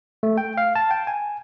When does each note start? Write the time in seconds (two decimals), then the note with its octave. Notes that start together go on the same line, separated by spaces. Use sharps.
0.23 A3
0.38 G5
0.58 F5
0.76 A5
0.91 G5
1.07 G#5